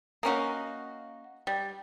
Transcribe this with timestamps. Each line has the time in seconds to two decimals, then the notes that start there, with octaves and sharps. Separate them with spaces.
0.23 A#3 C#4 D#4 F#4 F5 D#6
1.47 G3